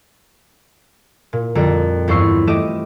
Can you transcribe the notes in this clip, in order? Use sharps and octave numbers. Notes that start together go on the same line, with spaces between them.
A#2
F2 D3 G3 A#5
E2 G2 C5 C#6 E6 C7
E3 A3 G4 D#5 D6 E7